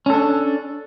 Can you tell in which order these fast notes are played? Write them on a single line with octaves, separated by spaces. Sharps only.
C#4 A4 D4